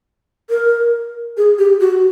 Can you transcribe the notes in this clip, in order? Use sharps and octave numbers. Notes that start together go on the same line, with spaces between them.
A#4
G#4
G4
F#4